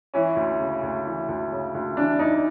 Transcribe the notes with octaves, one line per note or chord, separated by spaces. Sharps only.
E3 C#4
D2
C#3
D2
E3
D2
C#3
D2
E3 D4
E2 D#4